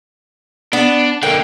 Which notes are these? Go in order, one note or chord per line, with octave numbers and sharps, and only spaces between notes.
B3 D4
D3 A#3 G5